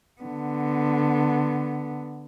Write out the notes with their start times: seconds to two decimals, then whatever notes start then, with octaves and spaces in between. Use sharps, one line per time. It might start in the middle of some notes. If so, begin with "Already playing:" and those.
0.22 D3 B3